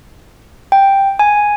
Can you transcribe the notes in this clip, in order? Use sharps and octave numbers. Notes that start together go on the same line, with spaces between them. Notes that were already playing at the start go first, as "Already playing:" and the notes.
G5
G#5